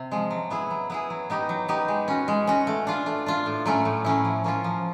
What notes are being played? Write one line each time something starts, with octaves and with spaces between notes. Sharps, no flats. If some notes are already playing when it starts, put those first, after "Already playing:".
Already playing: C3
F3 G#3
F#3
B3 E4 G#4
F#3
B3 E4 G#4
F#3
B3 D#4 G4
F#3
B3 D#4 G4
G#3
C#4 F#4
G#3
C#4 F#4
A3
D4 F4
A3
D4 F4
A2
F#3 A3 C#4 E4
A2
F#3 A3 C#4 E4
F3
A#3 C#4 F4
F3